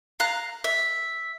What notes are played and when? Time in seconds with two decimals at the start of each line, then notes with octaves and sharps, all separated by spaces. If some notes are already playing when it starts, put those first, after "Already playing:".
0.20 F5 A#5 F#6
0.64 E5